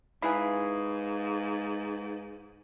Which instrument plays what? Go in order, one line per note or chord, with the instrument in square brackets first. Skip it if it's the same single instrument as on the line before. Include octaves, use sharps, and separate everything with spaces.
[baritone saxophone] G#2 [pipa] E4 G#4 [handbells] B4 F5 B6